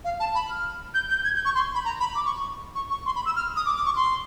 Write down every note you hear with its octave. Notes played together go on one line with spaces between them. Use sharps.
F5
A5
B5
F6
G6
G6
G#6
G6
C#6
C6
B5
A#5
B5
D6
C#6
C#6
C#6
C6
B5
E6
F6
D#6
D6
D6
C#6
C6